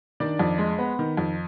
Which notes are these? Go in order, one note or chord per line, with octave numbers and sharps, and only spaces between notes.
D#3 D4 D5
F2
G#3
B3
D#3
F2